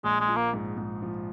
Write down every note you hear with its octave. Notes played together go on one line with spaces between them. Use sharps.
A#1 G#3
G#3
F3
A#3
G#2
G#2
F3